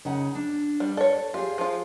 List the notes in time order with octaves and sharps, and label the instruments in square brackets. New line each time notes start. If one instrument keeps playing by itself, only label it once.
[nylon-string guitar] C#3 D#4 F#5
D4
[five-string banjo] G3
[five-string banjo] A4 C#5 [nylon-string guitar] D5
[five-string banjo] F4 [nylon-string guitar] G4 G#4
[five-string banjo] F3 F4